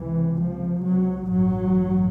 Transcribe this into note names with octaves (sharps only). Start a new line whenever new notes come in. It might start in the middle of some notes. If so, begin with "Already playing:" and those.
Already playing: C#2 C3 E3
F3
F#3
A1 G2 F#3